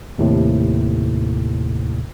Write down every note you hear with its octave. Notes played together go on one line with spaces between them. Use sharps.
D#2 A2 C3